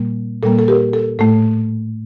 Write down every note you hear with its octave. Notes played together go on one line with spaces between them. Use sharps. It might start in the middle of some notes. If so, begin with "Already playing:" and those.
Already playing: A#2 G3 A#3
A#2 G3 A#3 A4
A4
G4 A#4
A4
A2 A3 A4